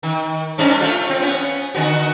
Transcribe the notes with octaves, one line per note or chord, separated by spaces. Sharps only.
D#3
G2 C#4 D4
A3 F4
C4
B3 C#4
D3 B3 F#4